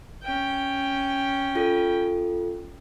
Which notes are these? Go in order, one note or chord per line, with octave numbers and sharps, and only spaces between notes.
C#4 G5
F4 A4